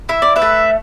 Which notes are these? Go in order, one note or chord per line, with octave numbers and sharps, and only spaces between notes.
E4 E5
D5
B4 E5
A3